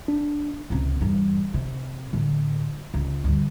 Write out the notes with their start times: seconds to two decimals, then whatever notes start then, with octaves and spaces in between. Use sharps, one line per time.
0.08 D4
0.70 C#2 C3
1.01 E2 G2
1.54 C3
2.13 A2 D3
2.94 C#2
3.24 D2 G2